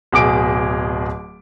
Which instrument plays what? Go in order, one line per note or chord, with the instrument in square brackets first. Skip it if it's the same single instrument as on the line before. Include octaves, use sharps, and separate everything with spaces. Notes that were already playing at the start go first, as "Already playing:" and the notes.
[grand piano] D1 B2 G#4 D6 D7